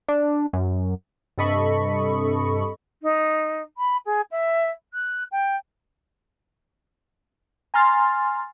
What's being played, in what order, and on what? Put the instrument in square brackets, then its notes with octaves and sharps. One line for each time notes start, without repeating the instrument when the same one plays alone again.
[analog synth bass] D4
F#2
[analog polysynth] G2 C3 A4 D#5 B5 C#6
[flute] D#4
B5
G#4
E5
F#6
G5
[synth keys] G#5 A#5 C6 F6 A6